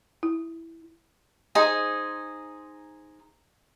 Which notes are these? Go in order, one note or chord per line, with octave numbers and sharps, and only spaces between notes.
E4
D#4 G#4 C5 G#5